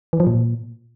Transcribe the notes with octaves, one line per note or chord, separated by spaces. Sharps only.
E3
F3
A#2